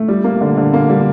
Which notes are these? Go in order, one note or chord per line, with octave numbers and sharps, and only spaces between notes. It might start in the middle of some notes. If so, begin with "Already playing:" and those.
Already playing: A3
G3
A#3
D3
D3
A#3
G3